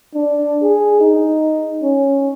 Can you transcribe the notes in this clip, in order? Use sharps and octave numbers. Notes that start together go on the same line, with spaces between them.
D4
G#4
D#4
C#4